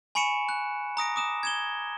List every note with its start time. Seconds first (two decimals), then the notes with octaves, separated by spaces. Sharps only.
0.15 G#5 B5 C#6 C#7 D7 E7
0.49 F#6
0.97 A#5 D#6 A#6 D7
1.16 D6 D#6 E7
1.43 G#6 E7 G7